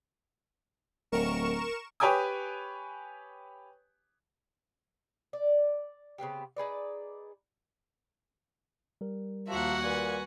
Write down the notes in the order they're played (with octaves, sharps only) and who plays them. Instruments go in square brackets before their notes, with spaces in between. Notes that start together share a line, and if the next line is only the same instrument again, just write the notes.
[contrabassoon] D1 [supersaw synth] A#4 C#6 E7
[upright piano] G4 B4 C#5 G5 G#5 D#6
[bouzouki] D5
C#3 B3 C4 G4
D#4 G#4 B4 D5
[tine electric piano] G3 A#4
[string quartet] D#2 A#3 E5 [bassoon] F3 [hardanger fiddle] F#4 F#5
[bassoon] A#2 [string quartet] B4 G#5